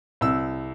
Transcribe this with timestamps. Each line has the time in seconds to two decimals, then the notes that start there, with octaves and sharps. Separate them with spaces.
0.21 C2 E6